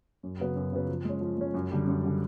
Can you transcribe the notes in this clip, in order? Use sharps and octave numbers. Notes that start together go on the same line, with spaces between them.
F#2
C#3 F#3 B3
F#2
C#3 F#3 B3
F3
G#3 C#4
F3
G#3 C#4
F#2
D3 G3
F#2
D3 G3